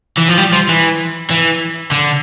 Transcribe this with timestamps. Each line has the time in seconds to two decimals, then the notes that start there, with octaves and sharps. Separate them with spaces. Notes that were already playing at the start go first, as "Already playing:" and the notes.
0.17 E3
0.28 F3
0.38 G3
0.53 F3
0.69 E3
1.30 E3
1.92 D3